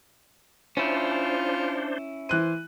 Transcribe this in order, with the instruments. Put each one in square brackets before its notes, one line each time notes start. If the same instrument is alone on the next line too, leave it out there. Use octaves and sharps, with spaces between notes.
[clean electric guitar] C#4 E4 [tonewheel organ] D4 C5 [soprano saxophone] F4
[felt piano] E3 F#6 D#7 [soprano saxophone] C5